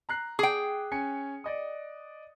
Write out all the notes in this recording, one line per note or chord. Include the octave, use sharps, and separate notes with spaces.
A#5 F#6 C7
G#4 G5 D6
C#4 G#5 C#7
D5 D#5 D#6